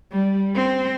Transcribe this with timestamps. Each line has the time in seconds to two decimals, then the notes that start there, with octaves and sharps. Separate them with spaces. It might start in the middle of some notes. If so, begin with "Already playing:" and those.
0.12 G3
0.55 C4